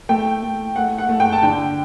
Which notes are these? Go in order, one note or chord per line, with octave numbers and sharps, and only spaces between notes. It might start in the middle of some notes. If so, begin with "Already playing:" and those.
A3 G5
A3
A3 F#5
F#5
A3
G5
A5
D3 G5